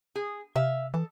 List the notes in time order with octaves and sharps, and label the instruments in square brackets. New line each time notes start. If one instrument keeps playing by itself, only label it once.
[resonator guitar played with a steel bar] G#4
[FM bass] C3 [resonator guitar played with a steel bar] E5 F5
[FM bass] E3 [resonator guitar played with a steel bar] A4